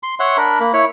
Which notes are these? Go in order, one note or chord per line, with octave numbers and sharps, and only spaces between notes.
C6
C#5 E5 F#5 C6
D4 A#4 B5
A#3 B5
E4 C#5 B5